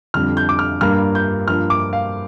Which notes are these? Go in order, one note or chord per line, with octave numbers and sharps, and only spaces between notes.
F2 D3 G3 F6
G6
D6
F6
G2 G3 A#3 F6
G6
G2 F3 A#3 F6
D6
F5